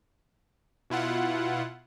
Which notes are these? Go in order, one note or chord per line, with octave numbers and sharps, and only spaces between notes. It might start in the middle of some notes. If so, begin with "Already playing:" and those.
B2 E4 F4 F#5